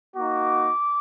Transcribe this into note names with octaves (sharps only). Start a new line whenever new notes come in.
A#3 D#4 F#4 D6